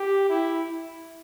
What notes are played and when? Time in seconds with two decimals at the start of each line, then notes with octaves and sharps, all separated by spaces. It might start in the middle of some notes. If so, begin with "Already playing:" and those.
Already playing: G4
0.30 E4